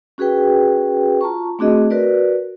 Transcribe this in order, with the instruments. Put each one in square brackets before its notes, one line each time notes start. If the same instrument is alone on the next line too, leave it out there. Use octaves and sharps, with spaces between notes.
[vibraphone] C#4 F#4 G#4 B4 G5
F4 A5 A#5 C#6
A3 C4 D4 F#4 G#4 D#5
F#4 A#4 B4 D5